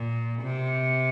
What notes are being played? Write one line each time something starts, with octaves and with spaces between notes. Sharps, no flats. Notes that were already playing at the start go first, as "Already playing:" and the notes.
Already playing: A#2
C3